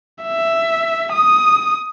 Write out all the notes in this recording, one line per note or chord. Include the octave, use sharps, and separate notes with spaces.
E5
D#6